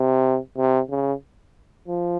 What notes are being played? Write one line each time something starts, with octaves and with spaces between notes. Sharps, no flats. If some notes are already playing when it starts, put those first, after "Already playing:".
Already playing: C3
C3
C#3
F3